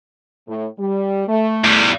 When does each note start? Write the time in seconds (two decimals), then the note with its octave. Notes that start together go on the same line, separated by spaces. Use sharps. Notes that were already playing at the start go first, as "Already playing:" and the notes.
0.48 A2
0.79 G3
1.28 A3
1.64 E2 G3